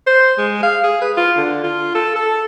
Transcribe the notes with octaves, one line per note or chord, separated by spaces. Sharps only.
C5
G#3
F5
G#4
B4
F4
D3
F4
A4
A4